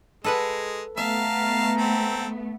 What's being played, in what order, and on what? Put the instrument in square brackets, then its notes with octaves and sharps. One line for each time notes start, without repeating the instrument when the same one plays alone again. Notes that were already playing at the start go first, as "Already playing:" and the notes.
[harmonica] G#3 [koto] A4 B4 F#5
[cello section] A3 B3 [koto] E5 [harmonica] F5 A5 [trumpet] A#5
[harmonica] C4 A4